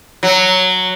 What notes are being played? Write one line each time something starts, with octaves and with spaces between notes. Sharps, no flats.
F#3